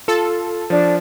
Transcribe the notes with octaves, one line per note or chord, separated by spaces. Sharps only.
F4 A4
F3 D4